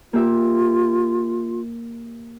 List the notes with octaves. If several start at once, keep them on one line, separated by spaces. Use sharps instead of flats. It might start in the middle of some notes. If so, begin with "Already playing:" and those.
A#3 F4 G4 E5